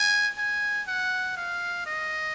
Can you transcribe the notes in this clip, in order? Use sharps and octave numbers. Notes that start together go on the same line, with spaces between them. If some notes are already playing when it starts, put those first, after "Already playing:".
Already playing: G#5
G#5
F#5
F5
D#5